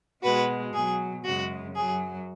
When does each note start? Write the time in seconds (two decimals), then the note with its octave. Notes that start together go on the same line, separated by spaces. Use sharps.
0.23 B2 G#3 F#4 B4
0.73 B2 F#3 G#4
1.25 F#2 C#3 G#3 F#4
1.75 F#2 F#3 G#4